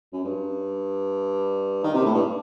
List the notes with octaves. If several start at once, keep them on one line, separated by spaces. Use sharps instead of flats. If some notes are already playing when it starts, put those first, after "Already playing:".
F#2
G2
D#3
C3
A2
G2